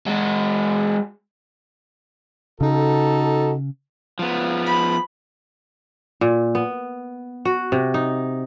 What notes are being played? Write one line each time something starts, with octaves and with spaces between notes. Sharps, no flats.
G#3 F#4
C#3 D#4 F#4 A4
F3 B3
B5
A#2
B3
F#4
C3
D#4